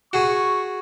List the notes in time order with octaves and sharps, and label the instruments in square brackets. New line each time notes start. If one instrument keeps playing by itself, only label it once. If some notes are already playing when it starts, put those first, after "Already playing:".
[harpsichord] F#4 G#4 [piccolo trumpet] C#6